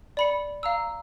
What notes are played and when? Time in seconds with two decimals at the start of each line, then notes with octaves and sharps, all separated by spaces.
0.17 D5 B5 C#7
0.63 F5 A#5 E6